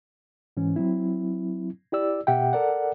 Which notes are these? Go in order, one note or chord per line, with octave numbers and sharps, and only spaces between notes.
G#2 E3 C#4
F#3 C4 E4
E4 G4 D5 E6
B2 G4 E5 F#5 G5
A4 A#4 D5 F#5